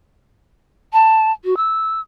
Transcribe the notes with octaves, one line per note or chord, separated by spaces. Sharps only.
A5
F#4
E6